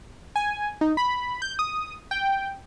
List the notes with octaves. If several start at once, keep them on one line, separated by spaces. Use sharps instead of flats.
G#5
D#4
B5
G6
D#6
G5